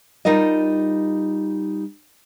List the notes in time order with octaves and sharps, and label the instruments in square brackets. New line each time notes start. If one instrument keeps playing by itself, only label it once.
[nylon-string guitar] G3 D#4 F4 A#4 D#5